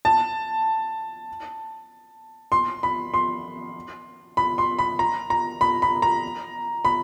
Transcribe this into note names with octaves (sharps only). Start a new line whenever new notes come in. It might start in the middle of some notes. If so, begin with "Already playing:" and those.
A5
C6
B5
C6
B5
C6
B5
A#5
A#5
B5
B5
A#5
B5